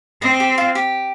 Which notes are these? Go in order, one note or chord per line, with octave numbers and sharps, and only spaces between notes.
C4 D#5
G4
F4
G4